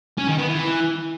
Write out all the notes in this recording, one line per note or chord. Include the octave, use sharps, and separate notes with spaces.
C#4
D#3
B3
E3